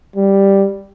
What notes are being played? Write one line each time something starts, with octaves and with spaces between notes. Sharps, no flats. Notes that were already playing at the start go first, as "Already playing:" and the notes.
G3